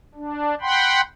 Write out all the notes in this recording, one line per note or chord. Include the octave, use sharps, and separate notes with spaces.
D4
F#5 G5 B5 C6